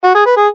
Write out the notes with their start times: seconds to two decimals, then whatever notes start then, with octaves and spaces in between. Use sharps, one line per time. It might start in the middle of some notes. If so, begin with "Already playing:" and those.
0.04 F#4
0.15 G#4
0.26 B4
0.37 G#4